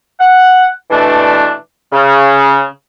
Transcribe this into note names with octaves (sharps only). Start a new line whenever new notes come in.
F#5
B2 E3 A3 D4
C#3